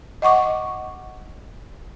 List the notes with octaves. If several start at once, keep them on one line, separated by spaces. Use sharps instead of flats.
D#5 F#5 C#6 D6